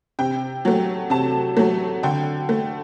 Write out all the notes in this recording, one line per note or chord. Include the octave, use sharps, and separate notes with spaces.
C3 G5
F#3 A3
C3 A5
F#3 A3
D3 G5
A3